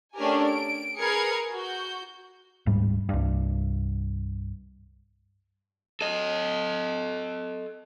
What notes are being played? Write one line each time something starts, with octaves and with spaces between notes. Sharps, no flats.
A3 C#4 D4 G4 A#4 G#5
D7
G#4 A#4 B4 G#6 C7 C#7
F#4 G6
D1 G#2 G3
C2 G2
A4 D#5